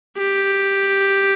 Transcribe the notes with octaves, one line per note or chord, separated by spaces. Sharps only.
G4